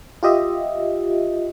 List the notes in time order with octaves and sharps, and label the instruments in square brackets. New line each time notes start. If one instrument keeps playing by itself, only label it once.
[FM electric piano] F4 G4 D#5 E5